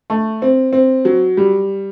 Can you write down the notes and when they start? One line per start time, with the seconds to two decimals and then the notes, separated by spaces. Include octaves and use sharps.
0.10 A3
0.42 C4
0.73 C4
1.05 F#3
1.37 G3